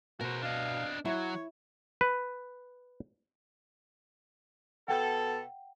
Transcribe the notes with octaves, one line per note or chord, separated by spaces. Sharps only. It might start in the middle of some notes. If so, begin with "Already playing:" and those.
B2 F#4 A#4 C5
D4 D#5 F5
F#3 E4 C#5
B4
B2 A4 F#5 G5